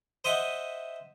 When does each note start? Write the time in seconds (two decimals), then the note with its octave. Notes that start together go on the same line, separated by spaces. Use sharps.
0.24 C5 D#5 E5 F#5 G#5